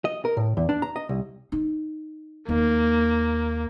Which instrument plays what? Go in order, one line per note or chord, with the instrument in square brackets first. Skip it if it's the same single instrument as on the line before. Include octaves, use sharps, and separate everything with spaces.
[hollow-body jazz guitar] D#5
A#4
A2
E2
D4
A#5
D#5
C2
[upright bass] D#4
[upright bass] D#2 [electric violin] A#3